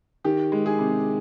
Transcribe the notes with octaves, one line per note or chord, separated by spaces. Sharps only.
D#3 G4
G#3
G#4
C3